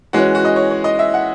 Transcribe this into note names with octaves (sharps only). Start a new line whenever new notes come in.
E3 G#3 C#4 F#4
F#4
D#5
C#5
C#5
D#5
E5
F#5